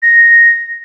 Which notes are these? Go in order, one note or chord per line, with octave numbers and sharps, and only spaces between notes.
A#6